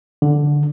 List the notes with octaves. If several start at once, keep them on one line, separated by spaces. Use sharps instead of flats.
D3